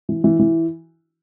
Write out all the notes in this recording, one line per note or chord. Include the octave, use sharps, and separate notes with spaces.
E3
E3
E3